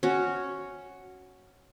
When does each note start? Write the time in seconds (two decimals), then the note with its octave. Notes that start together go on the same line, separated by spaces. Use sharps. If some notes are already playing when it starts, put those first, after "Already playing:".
0.03 C#4 F#4